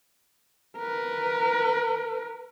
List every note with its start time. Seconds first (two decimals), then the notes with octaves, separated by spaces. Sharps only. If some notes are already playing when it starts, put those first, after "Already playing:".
0.78 A#4 B4